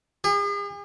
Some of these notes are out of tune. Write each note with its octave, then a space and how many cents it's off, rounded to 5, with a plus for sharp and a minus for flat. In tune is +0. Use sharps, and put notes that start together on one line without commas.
G#4 -45